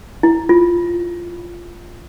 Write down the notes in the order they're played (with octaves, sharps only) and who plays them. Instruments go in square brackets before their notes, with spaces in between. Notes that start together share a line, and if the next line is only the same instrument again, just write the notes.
[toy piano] E4
F4